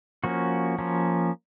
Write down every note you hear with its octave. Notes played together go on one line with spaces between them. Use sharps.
F3 A#3 C#4 F#4
F3 A#3 C#4